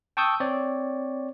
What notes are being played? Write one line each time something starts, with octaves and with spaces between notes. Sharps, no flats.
G5 A5 C#6 D#6 E6 G6
C4 C#5 D5